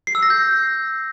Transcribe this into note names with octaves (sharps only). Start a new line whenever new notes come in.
C7
E6
A#6
G6